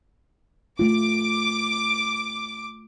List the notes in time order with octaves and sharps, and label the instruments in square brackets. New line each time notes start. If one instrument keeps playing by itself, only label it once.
[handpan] A3 F4 [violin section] D6